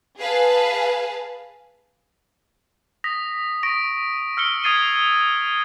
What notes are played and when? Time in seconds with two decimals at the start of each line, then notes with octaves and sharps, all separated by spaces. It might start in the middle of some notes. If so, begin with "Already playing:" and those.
0.19 G#4 B4 F5 A5
3.04 D#6 A#6 B6
3.63 C#6 D#6 A#6 D7
4.37 E6 F6 C#7 G7
4.64 D#6 F6 G#6 A6 C7 D#7